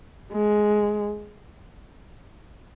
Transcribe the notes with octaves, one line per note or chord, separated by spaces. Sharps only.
G#3